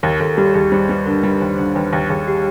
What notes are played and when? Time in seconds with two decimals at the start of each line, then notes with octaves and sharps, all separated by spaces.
0.03 D#2 A#4
0.20 D#2 A4
0.37 G3 G4
0.54 D#2 G#4
0.72 G3 C5
0.89 G3 B4
1.06 D3 A#4
1.23 G3 B4
1.41 D#2 C5
1.58 D3 C5
1.75 D#2 B4
1.93 D#2
2.10 D#2 G#4
2.28 G4